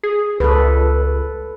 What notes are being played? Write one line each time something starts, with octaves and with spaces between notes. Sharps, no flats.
G#4
C#2 A4 B4